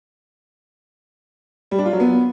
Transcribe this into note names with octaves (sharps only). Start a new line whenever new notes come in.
G3
D4
F4
F#3
B3